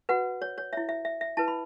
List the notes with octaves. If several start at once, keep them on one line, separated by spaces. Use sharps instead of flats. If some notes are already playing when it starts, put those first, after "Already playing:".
F#4 B4 F#5
C#5
C#5
E4 C#5 E5
E5
E5
E5
E4 B4 A5
B5